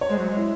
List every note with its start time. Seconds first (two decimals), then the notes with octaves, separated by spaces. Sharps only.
0.01 C#5
0.09 G#3 C5
0.18 F#3
0.28 G#3
0.37 E4